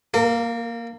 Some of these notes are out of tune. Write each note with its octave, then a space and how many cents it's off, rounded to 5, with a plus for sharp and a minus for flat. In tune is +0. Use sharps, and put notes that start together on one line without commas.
A#3 +0 A#4 -40